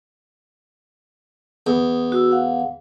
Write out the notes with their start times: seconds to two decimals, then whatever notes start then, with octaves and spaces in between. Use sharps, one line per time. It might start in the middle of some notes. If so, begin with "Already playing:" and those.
1.66 E2 D#6
2.12 F#4 E6
2.31 F5 F#5